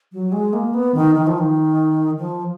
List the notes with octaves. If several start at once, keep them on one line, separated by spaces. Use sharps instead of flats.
F#3
G#3
A#3
B3
D#3
D#3
F3
D#3
F3